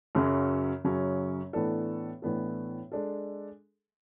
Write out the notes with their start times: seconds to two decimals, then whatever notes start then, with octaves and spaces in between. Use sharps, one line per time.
0.15 F#2 C#3 F#3 C#4
0.84 F#2 C#3 F#3 C#4
1.53 A2 E3 B3 D4 A4
2.22 A2 E3 B3 D4 A4
2.92 G#3 D4 A4